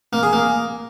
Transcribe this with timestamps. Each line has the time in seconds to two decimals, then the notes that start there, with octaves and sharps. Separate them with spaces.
0.13 A#3
0.23 G#4
0.33 A#3